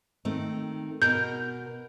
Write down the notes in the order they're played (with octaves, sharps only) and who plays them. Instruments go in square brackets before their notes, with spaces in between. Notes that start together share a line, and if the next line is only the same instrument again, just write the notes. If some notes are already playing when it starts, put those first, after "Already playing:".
[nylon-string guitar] D#3 A3 C4
[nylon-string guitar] B2 A#4 [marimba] G6